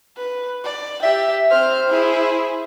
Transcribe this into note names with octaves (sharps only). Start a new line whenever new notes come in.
B4
D5
G4 E5 G5
C4 C5 F6
E4 G#4